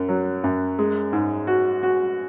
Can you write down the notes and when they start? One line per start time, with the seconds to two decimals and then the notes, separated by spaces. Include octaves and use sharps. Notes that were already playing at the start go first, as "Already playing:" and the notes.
Already playing: F#2
0.09 F#3
0.44 F#2
0.79 G#3
1.13 G#2
1.47 F#4
1.83 F#4